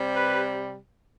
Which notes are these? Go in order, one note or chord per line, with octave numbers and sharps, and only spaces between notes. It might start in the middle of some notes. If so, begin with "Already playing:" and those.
Already playing: C3 G3
B4